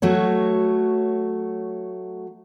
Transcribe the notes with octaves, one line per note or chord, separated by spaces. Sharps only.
F#3 A3 F#4 C#5